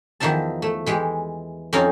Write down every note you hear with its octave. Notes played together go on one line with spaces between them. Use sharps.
E2 D#3 F3 D#4 E5 A5
A3
E3 G#3 G4
F2 C4 C#4 D#4 F4 C#5